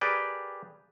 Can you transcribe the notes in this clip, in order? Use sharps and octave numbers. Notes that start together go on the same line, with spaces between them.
G4 G#4 A#4 B4 D5 G5